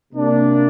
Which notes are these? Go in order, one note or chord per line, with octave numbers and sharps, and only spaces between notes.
C3 A#3 D4